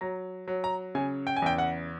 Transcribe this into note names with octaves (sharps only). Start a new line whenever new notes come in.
F#3 A#5
F#3
A#5
C#3 G#5
G5
G#5
E2 G5
F#5